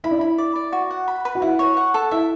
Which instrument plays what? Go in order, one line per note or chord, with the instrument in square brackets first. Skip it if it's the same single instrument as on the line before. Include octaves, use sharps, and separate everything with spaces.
[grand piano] E4 [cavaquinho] B5
[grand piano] D4
[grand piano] E4 [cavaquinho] B5
[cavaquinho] D5
D5
F#4
F#5
B5
B4
[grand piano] F#4
[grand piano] E4 [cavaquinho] F#5
[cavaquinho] C#5
F#5
A4
[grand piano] E4 [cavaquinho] E5